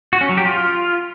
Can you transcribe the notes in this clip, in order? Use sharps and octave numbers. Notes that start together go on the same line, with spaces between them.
F#4
C#4
F#3
G4
F4